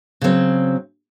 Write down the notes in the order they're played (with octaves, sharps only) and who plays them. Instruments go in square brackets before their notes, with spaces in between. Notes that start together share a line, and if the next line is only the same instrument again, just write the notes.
[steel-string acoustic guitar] C#3 F#3 C4